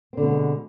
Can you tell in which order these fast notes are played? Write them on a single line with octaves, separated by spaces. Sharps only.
C4 D3 B2 A3 G#3